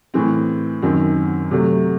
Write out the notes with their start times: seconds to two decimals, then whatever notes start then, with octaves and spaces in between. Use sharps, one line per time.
0.14 A2 E3 C4
0.82 F#2 D#3 F#3 C4
1.51 C3 F#3 A3